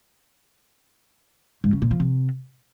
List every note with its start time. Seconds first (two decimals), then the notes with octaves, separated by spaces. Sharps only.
1.64 G#2
1.73 C#3
1.82 A#2
1.91 F3
2.00 C3